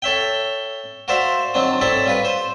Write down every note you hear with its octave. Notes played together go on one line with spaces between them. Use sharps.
A4 C#5 E5 G5
F#4 A#4 C5 D5 E5 F5
D#3 F#3 C4 D4
C4 A4 C#5 D5 E5
G3 F4 B4
C5